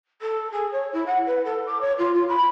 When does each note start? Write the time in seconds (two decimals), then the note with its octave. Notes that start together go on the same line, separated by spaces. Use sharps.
0.21 A4
0.52 G#4
0.72 C#5
0.93 E4
1.06 F#5
1.26 B4
1.44 A4
1.66 D6
1.80 C#5
1.98 F4
2.14 F4
2.28 B5